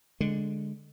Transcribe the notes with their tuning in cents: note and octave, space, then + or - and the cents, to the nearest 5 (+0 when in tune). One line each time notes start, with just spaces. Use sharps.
D3 +0 G#3 +0